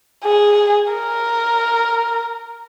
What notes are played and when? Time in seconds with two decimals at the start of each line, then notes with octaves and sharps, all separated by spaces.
0.25 G#4
0.93 A#4